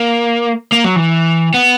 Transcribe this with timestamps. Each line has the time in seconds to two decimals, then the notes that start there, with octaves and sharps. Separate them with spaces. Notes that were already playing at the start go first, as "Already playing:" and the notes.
Already playing: A#3
0.72 A#3
0.84 F#3
0.96 E3
1.54 B3